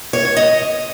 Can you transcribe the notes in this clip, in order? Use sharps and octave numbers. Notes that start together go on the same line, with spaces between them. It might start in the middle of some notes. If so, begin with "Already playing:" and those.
C#5
C#5
D#5